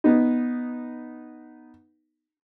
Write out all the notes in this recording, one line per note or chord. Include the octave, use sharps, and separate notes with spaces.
B3 D#4